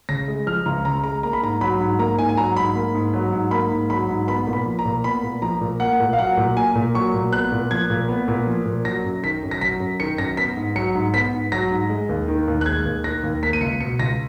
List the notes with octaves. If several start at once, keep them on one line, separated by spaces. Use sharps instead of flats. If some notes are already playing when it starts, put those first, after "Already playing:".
C#3 A#6
G#3
F3 F6
C#2 A#5
C#3 A#5
G#3 A#5
A#3 A#5
B5
G#2 A#5
F#3 B5
G#2
A#3 A#5
G#2 G#5
G#5
F#3 A#5
G#2 B5
A#3
G#2
F#3
G#2
A#3 B5
G#2
F#3 B5
G#2
B3 B5
A#2
B5
F3
A#5
A#2
B3 B5
A#2
F3 A#5
A#2
A#3 F#5
A#2
F5
F#3 F#5
A#2
A#3 G#5
A#2
F#3 C#6
A#2
B3 F#6
A#2
F3 G#6
A#2
B3
A#2
F3
A#2
F#3 A#6
F#2
D#3 B6
F#2
A#6
F#3 B6
F#2
D#3 C#7
F#2 A#6
B3 B6
G#2
F#3 C#7
G#2
B3 B6
G#2
F#3 A#6
G#2
G#3
D#2
D#3
D#2
F#6
G#3 G#6
D#2
D#3 A#6
D#2
A#3 B6
D#7
C#2 C#7
B2 C#7
C#2 A#6